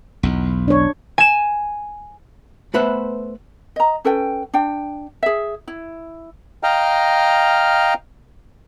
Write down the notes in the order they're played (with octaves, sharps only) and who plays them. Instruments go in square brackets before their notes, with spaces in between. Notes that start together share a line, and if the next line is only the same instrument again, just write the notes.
[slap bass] B1 E2
[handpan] D4 C#5
[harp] G#5 E7
[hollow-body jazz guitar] A3 B3 B4 C5 E5 F#5
[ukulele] D#5 A#5
C#4 A4 B4 G5
D4 G5
G#4 E5
E4
[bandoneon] D#5 F5 G5 A#5 F6